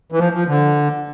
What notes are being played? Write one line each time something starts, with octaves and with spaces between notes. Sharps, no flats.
E3
F3
F3
D3